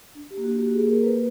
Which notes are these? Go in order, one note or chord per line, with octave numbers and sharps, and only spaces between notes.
D4
G4
A#3
F#4
A#3 G4
G#4
A#3
A#4
A#3 B4